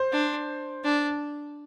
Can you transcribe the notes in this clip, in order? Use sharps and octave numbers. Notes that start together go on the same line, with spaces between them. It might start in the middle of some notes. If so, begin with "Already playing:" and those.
Already playing: C5
D4
D4